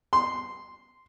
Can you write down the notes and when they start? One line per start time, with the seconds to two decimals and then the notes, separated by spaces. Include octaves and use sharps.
0.13 C6